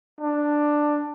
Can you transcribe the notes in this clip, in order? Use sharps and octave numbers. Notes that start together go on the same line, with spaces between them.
D4